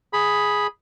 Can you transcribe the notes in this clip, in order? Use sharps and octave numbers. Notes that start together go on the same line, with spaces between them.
G#4 B5